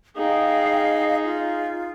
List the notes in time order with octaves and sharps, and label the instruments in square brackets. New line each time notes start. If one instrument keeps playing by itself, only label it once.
[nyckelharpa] D#4 G#4 [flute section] D#5 F5 G5
[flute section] F4